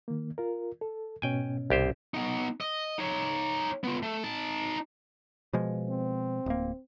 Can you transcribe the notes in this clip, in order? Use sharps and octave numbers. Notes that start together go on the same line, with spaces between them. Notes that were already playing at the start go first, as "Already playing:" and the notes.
D#3 A#3
F4 A#4
A4
G#2 B2 C#4 G5 G#5
C2 G4 C5
B3 D#4
D#5
D#4 C#5
B3 F4
A3
D#4 A5
B2 F3 G#3
C4
D1 A#3